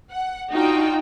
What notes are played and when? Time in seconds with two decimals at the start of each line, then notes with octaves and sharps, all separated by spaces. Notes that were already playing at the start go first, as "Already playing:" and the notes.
0.12 F#5
0.51 D4 D#4 F4 F#4 G5